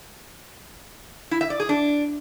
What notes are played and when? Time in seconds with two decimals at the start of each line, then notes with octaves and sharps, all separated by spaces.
1.31 E4
1.41 E5
1.50 D5
1.60 G#4
1.69 D4